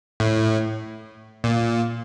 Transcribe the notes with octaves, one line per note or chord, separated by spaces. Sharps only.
A2
A#2